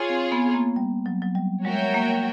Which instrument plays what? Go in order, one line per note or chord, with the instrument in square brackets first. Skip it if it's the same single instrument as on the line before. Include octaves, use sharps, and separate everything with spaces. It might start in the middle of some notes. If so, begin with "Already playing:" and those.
Already playing: [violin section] F4 G#4 C#5
[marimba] C4
B3
A#3
G3
F#3
F#3
G3
[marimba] G#3 [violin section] F#4 A#4 C#5 E5 G5
[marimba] A#3